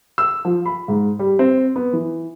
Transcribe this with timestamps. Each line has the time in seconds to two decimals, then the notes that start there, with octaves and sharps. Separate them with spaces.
0.18 E6
0.45 F3
0.66 B5
0.88 G#2
1.19 G3
1.39 C4
1.76 B3
1.93 E3